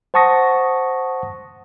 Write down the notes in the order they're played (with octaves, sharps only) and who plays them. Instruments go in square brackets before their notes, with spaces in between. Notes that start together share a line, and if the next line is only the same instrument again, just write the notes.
[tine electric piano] C5 F#5 A5 C#6 D#6 A#6